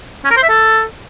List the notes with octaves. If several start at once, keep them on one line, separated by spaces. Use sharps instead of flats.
C#4
A#4
C5
E5
A4